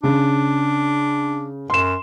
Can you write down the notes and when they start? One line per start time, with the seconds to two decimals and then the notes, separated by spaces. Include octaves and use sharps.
0.03 C#3 D4
1.70 F#2 C6 E7